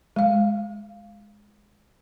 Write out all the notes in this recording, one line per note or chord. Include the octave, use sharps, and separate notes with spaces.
G#3 F5